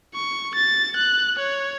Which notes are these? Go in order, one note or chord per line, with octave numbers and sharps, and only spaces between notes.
C#6
A6
F#6
C#5